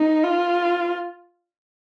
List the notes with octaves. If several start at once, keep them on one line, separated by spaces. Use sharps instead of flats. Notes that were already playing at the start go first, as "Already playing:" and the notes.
Already playing: D#4
F4